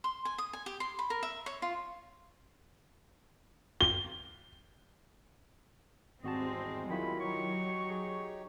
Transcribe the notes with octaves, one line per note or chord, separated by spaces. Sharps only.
C6
G#5
D#6
G#5
G4
C6
B5
A#4
E5
C#5
F4
G7
G#1 E2 G3 G#3 C4 F#4 D#5 A5
D#3 F#3 E4 F4 B5
D#4 G4 C#5 C#6
G#4